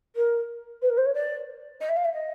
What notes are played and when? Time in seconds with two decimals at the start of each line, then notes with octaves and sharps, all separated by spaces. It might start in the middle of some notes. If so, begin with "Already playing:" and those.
0.16 A#4
0.82 B4
0.90 A#4
0.97 C5
1.06 C#5
1.14 D5
1.81 D#5
1.89 E5
1.96 F5
2.05 E5
2.13 D#5